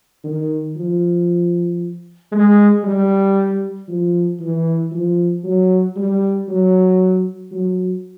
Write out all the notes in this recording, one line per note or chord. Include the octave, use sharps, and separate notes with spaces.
D#3
F3
G#3
G3
F3
E3
F3
F#3
G3
F#3
F#3